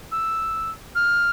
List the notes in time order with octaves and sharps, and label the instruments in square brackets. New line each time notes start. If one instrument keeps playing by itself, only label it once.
[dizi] E6
F6